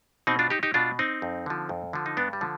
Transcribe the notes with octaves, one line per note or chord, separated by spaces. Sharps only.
B2 C4 D#4
D4 F4
D#4 G4
D#4 G4
B2 D4 F4
C4 D#4
F2
D3 F3
F2
D3 F3
D#4
G2 B3 D4
G3
D3 F3